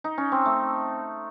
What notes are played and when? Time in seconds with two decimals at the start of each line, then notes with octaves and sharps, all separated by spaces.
0.04 D#4
0.18 C#4
0.32 C4
0.46 A3